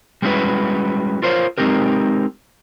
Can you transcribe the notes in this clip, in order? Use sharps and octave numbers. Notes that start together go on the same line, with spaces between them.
G3 G#3 C#4 E4 F#4 B4
F4 A#4 C5 C#5 F5
G#3 C4 D#4 G4 A#4